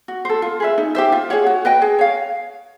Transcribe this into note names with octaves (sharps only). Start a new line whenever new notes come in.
F#4
A4 C5
F4
G#4 B4 E5
D#4
G4 C5 E5
F4
G#4 C#5 F#5
F#4
B4 D#5 G5
G#4
C#5 F5